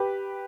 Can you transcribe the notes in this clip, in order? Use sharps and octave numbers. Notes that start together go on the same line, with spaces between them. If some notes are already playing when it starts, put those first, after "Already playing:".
Already playing: G4 B4